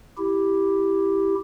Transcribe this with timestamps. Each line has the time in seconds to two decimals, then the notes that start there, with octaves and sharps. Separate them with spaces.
0.18 E4 G4